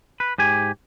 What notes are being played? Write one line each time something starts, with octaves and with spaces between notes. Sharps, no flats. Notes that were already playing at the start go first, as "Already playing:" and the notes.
B4
G#2 G4 G#5